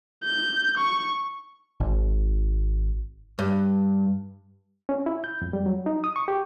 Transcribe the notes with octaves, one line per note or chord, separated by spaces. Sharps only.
G6
C#6
G#1
G2
C#4
E4
G6
F2
G3
F#3
D#4
D#6
C#6
G4